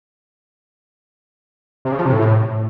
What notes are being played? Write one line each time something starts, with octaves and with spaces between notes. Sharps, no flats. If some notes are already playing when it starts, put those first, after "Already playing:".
C3
C#3
F3
C3
A2